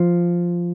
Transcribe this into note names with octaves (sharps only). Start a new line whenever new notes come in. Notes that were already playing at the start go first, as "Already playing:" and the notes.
Already playing: F3